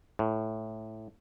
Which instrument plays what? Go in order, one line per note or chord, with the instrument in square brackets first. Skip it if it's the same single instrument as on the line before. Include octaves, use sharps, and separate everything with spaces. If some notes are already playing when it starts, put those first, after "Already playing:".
[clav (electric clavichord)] A2